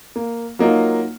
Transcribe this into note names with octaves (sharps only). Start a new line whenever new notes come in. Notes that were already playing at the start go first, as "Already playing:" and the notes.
A#3
F#3 A#3 D#4 F4